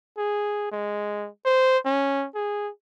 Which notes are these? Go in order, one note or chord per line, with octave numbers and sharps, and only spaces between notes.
G#4
G#3
C5
C#4
G#4